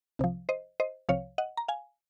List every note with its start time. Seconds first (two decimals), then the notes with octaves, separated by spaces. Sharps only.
0.19 C2 C3 F3
0.49 C5 D#5
0.80 C5 D#5
1.09 C2 C3 F3 C#5 F5
1.38 D#5 F#5
1.57 A#5
1.68 F5 G#5